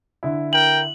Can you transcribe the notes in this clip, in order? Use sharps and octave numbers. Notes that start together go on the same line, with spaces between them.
D3 E4
A#4 G5 F#7